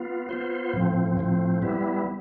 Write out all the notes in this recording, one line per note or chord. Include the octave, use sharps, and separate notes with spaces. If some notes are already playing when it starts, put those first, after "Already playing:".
Already playing: B3 F4
B3 F4 C5
A2 F3 C4
A2 F3 C4
G3 B3 E4